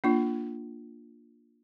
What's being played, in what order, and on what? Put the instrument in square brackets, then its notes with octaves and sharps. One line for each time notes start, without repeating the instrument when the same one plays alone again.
[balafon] A#3 D4 F4